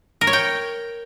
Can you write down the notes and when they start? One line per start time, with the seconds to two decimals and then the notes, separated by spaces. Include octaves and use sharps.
0.21 A#4
0.27 C#5
0.33 G5